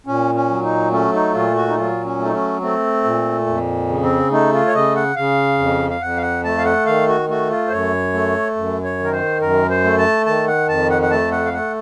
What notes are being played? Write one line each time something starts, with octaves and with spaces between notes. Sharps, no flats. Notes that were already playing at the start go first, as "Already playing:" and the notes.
A#2 C#4
C#4
F#3
D#4
A3 C#4
D#4
A#2 F4
F#4
D#4
F#3 F4
C#4
A3
D#4
C#4
A3 C4
A#2
F2
C#3
C4
A3 D#4
F4
C#5
C#3 D#5
F#5
C#3 F5
F2
F5
F2 F#5
F5
F#5
A3 A5
F5
F#5
D#3 F5
F#4
A3 F#4
F4
C5
F#2 C#5
A3
F#2
C#5
D#3
A#4
C5
F#2 A#4
C5
A3
A5
D#3 A5
F#5
F2 A5
F#5
F#5
A3 A5
F#5
F5
A3 F#5